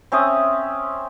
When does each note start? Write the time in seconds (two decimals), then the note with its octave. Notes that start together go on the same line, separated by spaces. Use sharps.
0.12 C4 C#4 E5 D#6